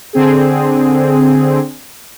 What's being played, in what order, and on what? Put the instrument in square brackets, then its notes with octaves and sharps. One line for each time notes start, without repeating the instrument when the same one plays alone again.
[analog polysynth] D3 C4 G#4